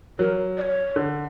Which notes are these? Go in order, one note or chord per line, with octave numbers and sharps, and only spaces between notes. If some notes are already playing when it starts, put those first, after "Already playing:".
F#3 A#4
D5
C#5
D3